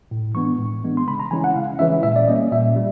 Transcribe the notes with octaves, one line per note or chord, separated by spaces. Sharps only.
A2
E3 G#3 B3 D4 C#6
A2
E3 G#3 B3 D4
C6
C#3 B5
A#5
E3 G#3 C#4 E4 G#5
F#5
C#3 F5
E3 G#3 C#4 E4 E5
A#2 E5
D5
G3 A#3 C#4 D#5
A#2 E5
G3